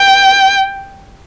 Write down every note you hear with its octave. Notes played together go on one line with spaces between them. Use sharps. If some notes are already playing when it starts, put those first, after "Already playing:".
Already playing: G5